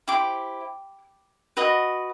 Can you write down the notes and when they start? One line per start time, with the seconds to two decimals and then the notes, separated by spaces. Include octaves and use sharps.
0.08 E4 G4 C5 D6
1.57 F#4 B4 D#5